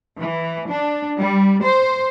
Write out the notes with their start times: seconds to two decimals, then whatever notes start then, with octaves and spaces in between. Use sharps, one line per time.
0.20 E3
0.68 D4
1.20 G3
1.64 C5